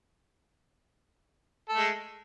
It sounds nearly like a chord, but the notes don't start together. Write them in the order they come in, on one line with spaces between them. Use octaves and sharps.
A4 A3 G#3